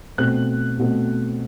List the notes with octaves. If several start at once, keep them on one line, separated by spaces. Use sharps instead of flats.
B2 A3 C4 F#6
B2 A3 C4